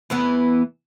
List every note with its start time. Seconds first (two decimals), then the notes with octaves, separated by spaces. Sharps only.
0.10 E2 E3 B3